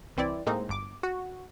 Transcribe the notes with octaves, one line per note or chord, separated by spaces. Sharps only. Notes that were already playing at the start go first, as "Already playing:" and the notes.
C2 E3 C4 E4 D5
A2 G#3 A#3 C4 D#4
G1 D6
F#4